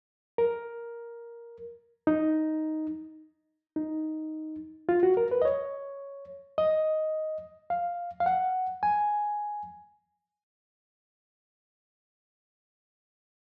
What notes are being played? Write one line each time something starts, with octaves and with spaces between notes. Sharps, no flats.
A#4
D#4
D#4
F4
F#4
A#4
B4
D#5
C#5
D#5
F5
F5
F#5
G#5